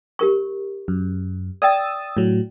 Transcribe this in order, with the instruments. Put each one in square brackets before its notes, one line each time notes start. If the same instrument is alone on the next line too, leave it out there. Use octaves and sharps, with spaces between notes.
[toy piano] G4 A#4 C#6
[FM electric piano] F#2
[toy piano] D5 E5 G5 [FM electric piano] D#6 E6 A6
[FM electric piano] A2 F#3